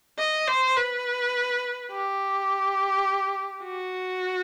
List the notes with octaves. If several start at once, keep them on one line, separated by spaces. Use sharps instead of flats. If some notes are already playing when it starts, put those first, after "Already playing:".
D#5
C5
B4
G4
F#4